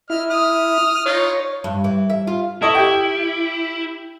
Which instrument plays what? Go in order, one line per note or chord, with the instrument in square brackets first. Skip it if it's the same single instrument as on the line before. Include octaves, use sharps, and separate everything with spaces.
[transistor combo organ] E4 [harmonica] D#5 F6
[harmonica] D#6 F6
[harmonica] D#4 F4 [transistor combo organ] C#5
[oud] G2
E3
E5
F4
[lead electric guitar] E4 [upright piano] A4 D#5 C#6
[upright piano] G4 G5